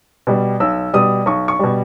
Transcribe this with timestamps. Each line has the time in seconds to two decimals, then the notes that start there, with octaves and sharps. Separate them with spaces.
0.27 B2 G3
0.60 B1 E6
0.93 B2 G3 D#6
1.26 B1 C#6
1.48 C#6
1.59 B2 G3